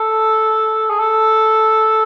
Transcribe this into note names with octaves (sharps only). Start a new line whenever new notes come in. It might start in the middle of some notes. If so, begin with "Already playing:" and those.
Already playing: A4
G#4
A4